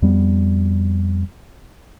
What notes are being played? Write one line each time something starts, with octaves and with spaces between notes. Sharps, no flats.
F2 G3 B3